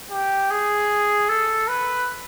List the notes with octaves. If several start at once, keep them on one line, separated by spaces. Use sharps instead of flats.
G4
G#4
A4
B4